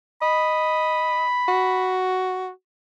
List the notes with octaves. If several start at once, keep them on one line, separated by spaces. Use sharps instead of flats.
D#5 B5
F#4